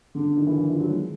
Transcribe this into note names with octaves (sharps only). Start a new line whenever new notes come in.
D3
D3
D#3
E3
F3
E3
F#3
G#3